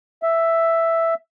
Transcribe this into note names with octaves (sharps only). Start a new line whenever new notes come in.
E5